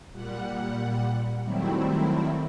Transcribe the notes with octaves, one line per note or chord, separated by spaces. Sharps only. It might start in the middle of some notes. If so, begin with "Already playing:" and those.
A#2 G3 F#5
D#3 F#3 G3 A3 C4 E4